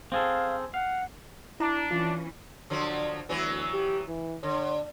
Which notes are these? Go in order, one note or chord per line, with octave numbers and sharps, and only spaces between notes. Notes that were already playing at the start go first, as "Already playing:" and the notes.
C4 G#4 A4 F5
F5 F#5
D4 E4 A#5
E3 C#4 F4
D3 F3 F#3
D2 E3 F#3 B3
G4
E3
D3 C#5